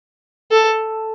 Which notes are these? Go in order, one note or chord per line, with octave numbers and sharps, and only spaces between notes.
A4